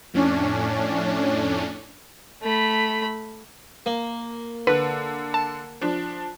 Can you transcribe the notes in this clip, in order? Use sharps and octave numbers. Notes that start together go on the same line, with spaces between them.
F2 A2 C#4 D4
A3 B5
A#3
D3 B4
A5
F3 D4